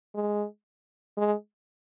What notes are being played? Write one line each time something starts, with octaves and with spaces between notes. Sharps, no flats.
G#3
G#3